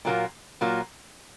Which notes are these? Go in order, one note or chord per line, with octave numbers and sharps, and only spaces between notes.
A#2 F#3 A#3 F4
A#2 F#3 A#3 F4